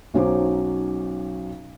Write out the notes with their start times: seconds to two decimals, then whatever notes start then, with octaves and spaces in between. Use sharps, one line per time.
0.14 B1 F#3 C#4 D#4 C5 D6